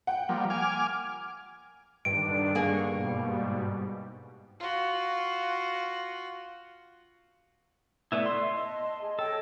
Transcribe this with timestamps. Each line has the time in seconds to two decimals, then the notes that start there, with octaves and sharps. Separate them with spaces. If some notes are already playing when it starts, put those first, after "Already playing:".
0.07 F#5 G5
0.29 F3 G3 A#3
0.50 G#5 D6 F6
2.05 G2 D3 D#3 D4 D7
2.55 D3 A#3 G#4 C#6
2.90 G#2 B2 G3
4.60 F4 F#4
8.12 A3 B3 E4 D5 E5 E6
8.26 C6
8.53 D#5 A5
9.02 G#4
9.19 A4 C#5 D#5 G5